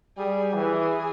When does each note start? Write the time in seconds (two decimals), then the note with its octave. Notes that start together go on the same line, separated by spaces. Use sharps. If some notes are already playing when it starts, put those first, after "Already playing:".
0.17 G3 G#4
0.54 E3